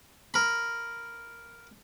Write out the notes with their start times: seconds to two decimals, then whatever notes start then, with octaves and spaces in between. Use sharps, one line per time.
0.34 A#4 B5